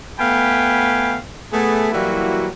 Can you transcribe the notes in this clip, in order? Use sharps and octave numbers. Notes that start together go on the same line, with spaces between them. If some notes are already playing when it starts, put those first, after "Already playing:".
A3 B3 F5 G5 G#5 B5
A3 B3 G#4
E3 F#3 G3 A#3 E4 F#4